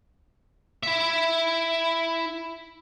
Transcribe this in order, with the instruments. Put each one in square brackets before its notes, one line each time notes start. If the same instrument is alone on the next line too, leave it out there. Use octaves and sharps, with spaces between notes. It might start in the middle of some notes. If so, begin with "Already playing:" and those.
[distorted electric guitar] E4 E5